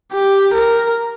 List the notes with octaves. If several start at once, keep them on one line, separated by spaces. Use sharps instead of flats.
G4
A#4